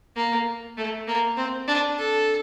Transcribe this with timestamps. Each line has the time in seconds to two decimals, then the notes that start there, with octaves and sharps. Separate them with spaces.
0.16 A#3
0.77 A3
1.07 A#3
1.37 C4
1.68 D4
1.98 A4